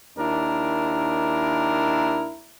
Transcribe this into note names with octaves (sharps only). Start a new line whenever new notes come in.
D#2 D4 E4 A#4